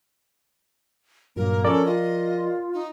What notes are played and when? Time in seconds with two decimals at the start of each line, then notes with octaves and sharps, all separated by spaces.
1.36 G2 A#2 F#3 A#3 A#4
1.65 F3 C#4 A4 A#4 D5
1.85 F4 D#5
2.74 D#4